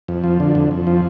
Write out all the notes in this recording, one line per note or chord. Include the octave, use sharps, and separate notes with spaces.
F2
F3
D3
F2
F2
F3